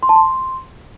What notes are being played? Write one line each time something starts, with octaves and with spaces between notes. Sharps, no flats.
C6
A5
C6